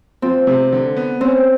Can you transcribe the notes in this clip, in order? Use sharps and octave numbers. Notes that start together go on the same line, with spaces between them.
F3 C4
C3
D3
B3
C4 C#4